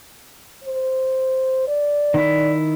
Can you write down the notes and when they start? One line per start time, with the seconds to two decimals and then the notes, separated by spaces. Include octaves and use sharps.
0.64 C5
1.68 D5
2.14 D#3 E4